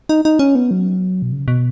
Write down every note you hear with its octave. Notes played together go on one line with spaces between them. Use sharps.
D#4
D#4
C#4
B3
F#3
B2
C#3
B2